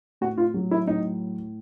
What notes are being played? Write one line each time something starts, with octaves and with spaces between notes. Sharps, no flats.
A2 F#4
F4
F#3
E4
A2 D#4